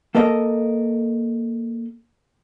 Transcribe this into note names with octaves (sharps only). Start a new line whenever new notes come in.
A#3 A4 A#4 D#5